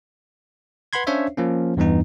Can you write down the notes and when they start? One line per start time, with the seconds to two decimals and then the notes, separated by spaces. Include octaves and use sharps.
0.93 B4 F#5 B5 C6 G#6
1.07 C#4 D4 C5 C#5 E5 F5
1.37 F3 A#3 C#4
1.77 E2 G2 E3 B3 D#4